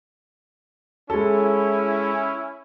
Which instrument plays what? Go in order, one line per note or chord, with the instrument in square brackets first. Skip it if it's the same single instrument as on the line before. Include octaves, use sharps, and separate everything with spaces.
[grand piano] G#3 A4 [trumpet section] C#4 E4